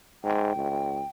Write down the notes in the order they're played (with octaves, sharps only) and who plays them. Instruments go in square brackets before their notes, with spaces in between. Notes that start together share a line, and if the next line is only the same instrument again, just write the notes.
[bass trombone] G#2 [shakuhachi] G5
[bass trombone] C#2